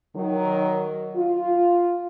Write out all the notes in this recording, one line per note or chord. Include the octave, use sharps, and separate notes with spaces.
D#3 F#3
F4